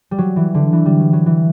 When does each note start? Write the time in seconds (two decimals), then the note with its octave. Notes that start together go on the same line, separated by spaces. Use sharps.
0.11 G3
0.18 F#3
0.36 E3
0.54 D3
0.73 E3
0.85 G3
1.00 F#3
1.13 F#3
1.26 E3